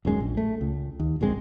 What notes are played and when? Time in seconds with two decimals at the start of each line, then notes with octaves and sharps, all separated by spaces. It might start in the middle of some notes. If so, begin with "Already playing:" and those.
0.05 D#1 F#2 G#3 C#4
0.20 A#1
0.37 A3
0.61 C#2
1.00 D#2
1.21 D1 A#1 G#3 C4